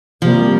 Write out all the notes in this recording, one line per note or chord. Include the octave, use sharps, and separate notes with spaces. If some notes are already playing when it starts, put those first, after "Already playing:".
C3 F3 G3 A#3